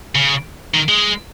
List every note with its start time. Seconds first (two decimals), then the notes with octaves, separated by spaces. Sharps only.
0.15 C#3
0.74 D#3
0.89 G#3